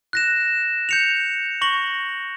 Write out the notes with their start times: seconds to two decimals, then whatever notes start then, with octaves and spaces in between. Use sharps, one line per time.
0.13 F#6 A#6 E7
0.89 G6 C#7 F7
1.62 C#6 A#6 F#7